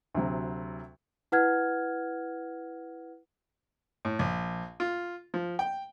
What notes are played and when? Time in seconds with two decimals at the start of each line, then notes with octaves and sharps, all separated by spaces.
0.14 D2 C3 F#3
1.32 E4 B4 F#5 F6 G#6
4.05 A2
4.19 A#1
4.80 F4
5.34 F3
5.59 G5